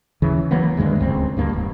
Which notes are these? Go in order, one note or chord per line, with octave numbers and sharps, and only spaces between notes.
D#2 C#3 E3
E3 F#3 A#3 B3
D2 G2 D#3 G#3
D1 C#2 C4
D2 G2 A#3
D#1